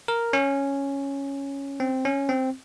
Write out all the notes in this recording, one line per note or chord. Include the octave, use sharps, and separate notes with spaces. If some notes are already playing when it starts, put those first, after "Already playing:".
A#4
C#4
C4
C#4
C4